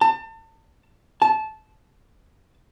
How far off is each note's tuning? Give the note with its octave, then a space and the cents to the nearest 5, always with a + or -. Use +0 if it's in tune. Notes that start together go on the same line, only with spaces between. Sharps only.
A5 +35
A5 -15